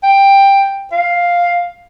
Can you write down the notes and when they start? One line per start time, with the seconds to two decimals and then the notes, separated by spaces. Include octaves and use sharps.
0.03 G5
0.92 F5